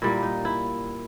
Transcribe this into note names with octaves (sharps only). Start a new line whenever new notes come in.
A#2 G3 A#3 E4
D#4
E4